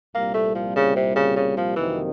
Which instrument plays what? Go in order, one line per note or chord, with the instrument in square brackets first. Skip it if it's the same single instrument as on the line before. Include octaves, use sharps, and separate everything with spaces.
[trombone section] C2 A#2 G3 C4 [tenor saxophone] A#3
[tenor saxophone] A3
F3
C#3
C3
C#3
C#3
F3
[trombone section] F2 C3 D#3 F#3 A#3 [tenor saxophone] E3